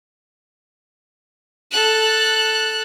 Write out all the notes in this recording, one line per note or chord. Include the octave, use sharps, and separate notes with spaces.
A4 F#6